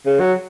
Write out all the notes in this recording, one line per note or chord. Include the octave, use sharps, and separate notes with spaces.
C#3
F#3